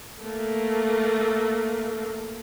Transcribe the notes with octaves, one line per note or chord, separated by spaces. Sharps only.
A3 A#3